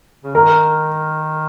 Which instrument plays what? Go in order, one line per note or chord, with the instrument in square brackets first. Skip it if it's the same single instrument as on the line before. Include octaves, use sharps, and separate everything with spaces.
[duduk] C#3
[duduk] D#3 [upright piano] A#4